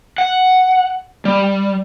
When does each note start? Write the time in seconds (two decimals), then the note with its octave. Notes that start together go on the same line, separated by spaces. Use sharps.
0.18 F#5
1.25 G3